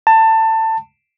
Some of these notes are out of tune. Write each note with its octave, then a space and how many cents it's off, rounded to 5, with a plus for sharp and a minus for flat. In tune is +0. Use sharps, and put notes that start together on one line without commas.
A5 +20